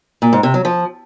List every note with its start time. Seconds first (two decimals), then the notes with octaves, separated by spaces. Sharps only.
0.22 A#2
0.33 G#2
0.43 C3
0.54 F#3
0.65 F3